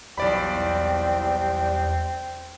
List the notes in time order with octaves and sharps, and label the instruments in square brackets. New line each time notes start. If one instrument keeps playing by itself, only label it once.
[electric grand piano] B1 D5 B5 [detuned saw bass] E2 [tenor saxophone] G3 [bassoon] C4